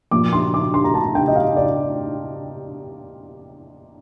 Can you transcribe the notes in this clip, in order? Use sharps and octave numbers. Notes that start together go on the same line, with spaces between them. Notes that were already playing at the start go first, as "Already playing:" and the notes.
A#2 F3 D6
C6
D6
C6
A#5
A5
G5
D#5
F5
D5